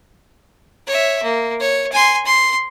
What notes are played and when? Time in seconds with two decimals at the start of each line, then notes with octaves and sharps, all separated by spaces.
0.87 C#5 E5
1.23 A#3
1.60 C#5
1.92 G#5 C6
2.26 C6